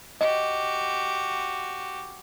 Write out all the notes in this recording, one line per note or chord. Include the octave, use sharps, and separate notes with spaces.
F#4 G4 D#5